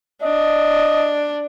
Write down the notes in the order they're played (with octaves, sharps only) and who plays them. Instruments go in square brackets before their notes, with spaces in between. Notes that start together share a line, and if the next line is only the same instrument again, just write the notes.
[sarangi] D4 [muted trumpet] D#5